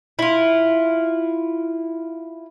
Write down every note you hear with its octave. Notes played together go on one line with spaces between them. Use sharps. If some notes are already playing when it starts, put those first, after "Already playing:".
E4 F4